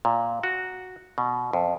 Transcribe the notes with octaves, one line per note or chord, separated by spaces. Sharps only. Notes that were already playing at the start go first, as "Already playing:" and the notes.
A#2
F#4
B2
F2